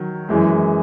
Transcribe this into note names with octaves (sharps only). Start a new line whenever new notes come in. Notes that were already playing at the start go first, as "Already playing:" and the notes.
Already playing: D#3 F#3
F#2 E3 G#3